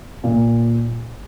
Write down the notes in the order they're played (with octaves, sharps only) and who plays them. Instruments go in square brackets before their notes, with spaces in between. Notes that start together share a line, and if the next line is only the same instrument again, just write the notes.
[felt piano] A#2